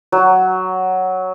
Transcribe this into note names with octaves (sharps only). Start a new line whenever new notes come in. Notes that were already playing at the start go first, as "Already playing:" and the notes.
F#3